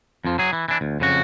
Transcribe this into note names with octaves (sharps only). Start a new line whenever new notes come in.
F2 F3
F#3 G#4
E3
E3 D4
D2
F2 C#3 F#4